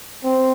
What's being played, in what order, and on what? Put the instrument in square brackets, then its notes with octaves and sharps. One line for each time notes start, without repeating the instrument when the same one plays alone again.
[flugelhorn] C4